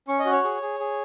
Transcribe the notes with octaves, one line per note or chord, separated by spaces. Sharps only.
C#4 C#6
D#5
F#4
C#5
G#4
G#4
G#4